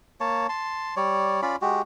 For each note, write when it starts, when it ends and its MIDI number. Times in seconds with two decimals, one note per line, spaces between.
0.20 0.47 58
0.20 0.47 73
0.20 0.47 81
0.49 0.95 81
0.49 0.95 84
0.96 1.41 55
0.96 1.41 73
0.96 1.41 74
1.42 1.56 61
1.42 1.56 65
1.42 1.56 74
1.42 1.56 83
1.62 1.82 56
1.62 1.82 66
1.62 1.82 67